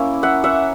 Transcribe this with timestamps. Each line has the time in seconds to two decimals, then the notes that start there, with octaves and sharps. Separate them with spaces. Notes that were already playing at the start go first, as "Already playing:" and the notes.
Already playing: A#3 C#4 E4
0.23 E5 F#5
0.44 E5 F#5